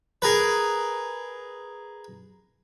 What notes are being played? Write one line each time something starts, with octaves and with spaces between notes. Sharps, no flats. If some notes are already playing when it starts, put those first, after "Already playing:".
G#4 A#4 B4